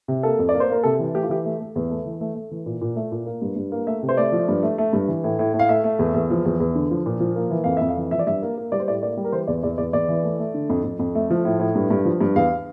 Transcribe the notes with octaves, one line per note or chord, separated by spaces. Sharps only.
C3
A#3 A4
F2
D5
A#3
C5
A#3 A#4
C3 A4
E3
A3 G4
F4
E3 G4
A3
A3
E2
A3
E3
A3
A3
E3
A#2
A#2
A3
A#2
A#3
G2
G2
A#3
A3 E5
C3
C5
A3 D5
F3
G2
A3
A3
G2
E3
A2
A2
A2
F5
A3 E5
A3
E2
E2
F3
E2
E2
D3
F3
A#2
F3
A#3
E3
F2 F5
F2 E5
F5
E3
F3 E5
D5
G2 E5
A#3
A#3
G3 D5
C5
A2 D5
A#3 D5
G3
A#4
E3 C5
E2 D5
E2 D5
E2 D5
E2 D5
E3
A3
A3
D3
F2
F2
F2
A3
F3
A2
A2
G2
G2
F3
G2
E2 F5